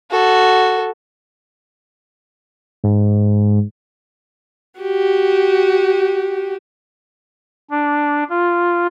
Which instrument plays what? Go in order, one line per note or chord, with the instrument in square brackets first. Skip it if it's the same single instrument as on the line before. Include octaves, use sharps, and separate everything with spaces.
[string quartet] F#4 [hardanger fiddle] A4
[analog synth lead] G#2
[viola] F#4 G4
[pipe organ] D4
F4